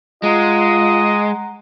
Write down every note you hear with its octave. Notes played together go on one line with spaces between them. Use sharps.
G#3 F4 D#5 F#5 A#5